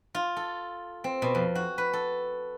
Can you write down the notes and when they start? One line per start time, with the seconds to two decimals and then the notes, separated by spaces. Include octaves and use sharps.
0.15 F4
0.36 A4
1.04 C4
1.22 B2
1.35 F2
1.55 F#4
1.78 B4
1.93 A4